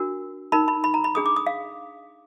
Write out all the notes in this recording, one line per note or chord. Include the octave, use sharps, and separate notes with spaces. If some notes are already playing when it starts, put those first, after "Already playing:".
Already playing: D4 F#4 A#4
D#4 A#4 B5
B5
B5
A#5
B5
D4 G#4 B4 D#6
D6
D#6
F5